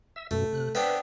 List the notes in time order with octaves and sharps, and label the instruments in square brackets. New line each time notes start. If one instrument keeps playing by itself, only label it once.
[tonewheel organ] E5 E6
[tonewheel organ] F#2 B2 [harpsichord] A3
[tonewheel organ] C3 F#6
[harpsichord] B3 C4 D4 [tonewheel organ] B4 E5